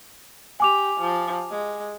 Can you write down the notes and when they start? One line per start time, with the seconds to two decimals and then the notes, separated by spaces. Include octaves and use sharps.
0.60 G4 G#5 D6 F7
1.00 F3
1.51 G#3